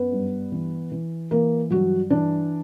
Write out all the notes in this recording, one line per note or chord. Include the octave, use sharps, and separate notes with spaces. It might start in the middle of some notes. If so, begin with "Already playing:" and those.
Already playing: F#2 B3 B4
G2
E3
E3
E3 A#3 A#4
G2 F#3 F#4
E3 D4